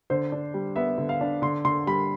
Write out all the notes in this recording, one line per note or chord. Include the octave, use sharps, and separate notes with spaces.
D3 C5
D4
G3
B3 E5
D3
F5
D4
D3 C6
D3 C6
G3 B5